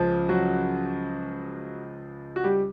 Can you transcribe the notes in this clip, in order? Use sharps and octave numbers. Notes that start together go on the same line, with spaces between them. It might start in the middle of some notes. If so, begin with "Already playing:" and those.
Already playing: C#2 C#3 F3
F#3 F#4
F#4
G3 G4